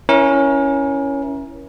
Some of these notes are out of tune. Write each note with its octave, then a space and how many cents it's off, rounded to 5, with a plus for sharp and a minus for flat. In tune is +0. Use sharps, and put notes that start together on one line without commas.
C#4 +0 E4 +0 A#4 +35